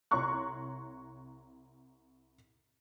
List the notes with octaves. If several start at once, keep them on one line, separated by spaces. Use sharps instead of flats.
C2 C#5 A#5 C6 C#6 F#6